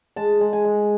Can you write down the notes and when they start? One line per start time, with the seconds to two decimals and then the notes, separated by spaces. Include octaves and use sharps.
0.16 G#3 A5
0.41 G#3
0.53 G#5
0.65 G#3